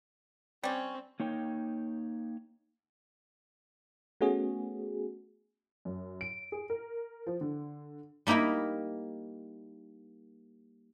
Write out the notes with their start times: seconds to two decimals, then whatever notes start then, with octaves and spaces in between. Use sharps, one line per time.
0.63 G3 C4 C#4
1.20 A#3 D#4 C#5 G5
4.21 A3 B3 C#4 F#4 G#4
5.85 F#2
6.21 D7
6.52 G#4
6.70 A#4
7.27 F3
7.41 D3
8.27 G3 A#3 D#4 E4 A#4